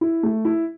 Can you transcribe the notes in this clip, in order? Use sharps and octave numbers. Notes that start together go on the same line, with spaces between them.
E4
A3
E4